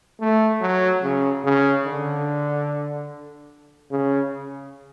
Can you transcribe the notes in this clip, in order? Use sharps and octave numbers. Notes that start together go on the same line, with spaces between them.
A3
F#3
C#3
C#3
D3
C#3